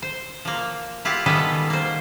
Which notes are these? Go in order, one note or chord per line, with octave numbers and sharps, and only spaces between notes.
C5
F3 A#3
E4 F4 G4 F5 F#5
D#3 G3 G#3 B3 A4 B4
A#3 C5